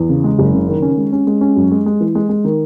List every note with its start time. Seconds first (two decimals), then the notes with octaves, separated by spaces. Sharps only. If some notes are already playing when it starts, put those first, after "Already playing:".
Already playing: E2
0.09 C#3
0.24 G#3
0.39 F#1
0.54 C#3
0.68 D#3
0.82 C#4
0.97 G#3
1.12 C#4
1.27 G#3
1.41 C#4
1.56 F#2
1.71 G#3
1.86 G#3
2.00 E3
2.15 G#3
2.29 G#3
2.44 D#3